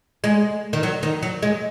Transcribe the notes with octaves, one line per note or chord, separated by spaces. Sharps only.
G#3
D#3
F#3
D#3
F#3
G#3